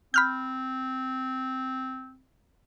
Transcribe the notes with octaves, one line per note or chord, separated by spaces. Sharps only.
C4 B5 F6 G6